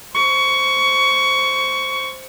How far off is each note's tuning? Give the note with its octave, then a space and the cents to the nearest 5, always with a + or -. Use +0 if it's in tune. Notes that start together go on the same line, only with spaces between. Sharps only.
C5 +0 C#6 +15